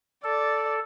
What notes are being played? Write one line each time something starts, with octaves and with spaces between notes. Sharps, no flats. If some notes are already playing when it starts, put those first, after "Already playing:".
A4 D5